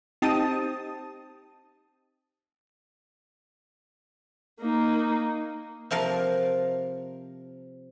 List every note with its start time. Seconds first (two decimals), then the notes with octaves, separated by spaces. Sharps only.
0.22 C4 D#4 G4 A5 D#6
4.60 A#3 D#4
5.91 C3 F3 A#4 F5